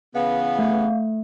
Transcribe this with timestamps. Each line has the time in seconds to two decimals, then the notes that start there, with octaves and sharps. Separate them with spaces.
0.15 C#3 E3 B3 F5
0.59 A3